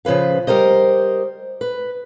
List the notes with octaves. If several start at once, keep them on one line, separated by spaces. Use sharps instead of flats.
C#3 F3 C#4 B4 F5
G3 G4 A#4 C5 D#5
B4